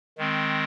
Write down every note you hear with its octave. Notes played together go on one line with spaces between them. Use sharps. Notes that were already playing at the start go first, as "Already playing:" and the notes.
D#3 G#3 C4